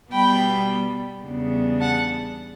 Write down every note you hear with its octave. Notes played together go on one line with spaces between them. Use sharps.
B2 G3 B3 G5 B5
E2 C#3 G3 B3 D4
F#5 A5